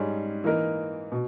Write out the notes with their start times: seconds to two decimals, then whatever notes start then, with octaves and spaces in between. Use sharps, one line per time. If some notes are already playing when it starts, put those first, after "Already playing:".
Already playing: G#2 G3 C#4 G#4
0.44 E3 A#3 D#4 A#4
1.12 B2